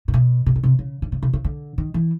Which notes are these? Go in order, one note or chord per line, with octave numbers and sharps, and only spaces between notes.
A#2
B2
C3
B2
C3
C#3
D3
C#3
C3
C#3
D3
D#3
E3